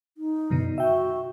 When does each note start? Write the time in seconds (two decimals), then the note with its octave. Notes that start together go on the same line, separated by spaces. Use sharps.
0.18 D#4
0.50 F#2 B2 D3
0.78 F#4 E5 G5